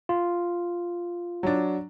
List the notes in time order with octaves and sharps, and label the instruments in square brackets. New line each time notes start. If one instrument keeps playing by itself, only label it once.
[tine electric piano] F4
[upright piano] F#3 D4